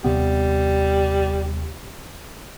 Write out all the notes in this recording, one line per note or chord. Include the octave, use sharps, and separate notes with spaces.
D#2 C3 G3 B3